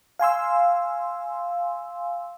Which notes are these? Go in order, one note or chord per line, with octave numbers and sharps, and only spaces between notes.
F5 G#5 C6 E6